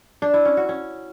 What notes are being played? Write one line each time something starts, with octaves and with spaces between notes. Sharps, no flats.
D4
E4
C#4
F#4
C#4